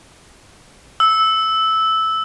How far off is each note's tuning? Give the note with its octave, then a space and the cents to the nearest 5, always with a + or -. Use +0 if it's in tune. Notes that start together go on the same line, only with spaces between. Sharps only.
E6 -10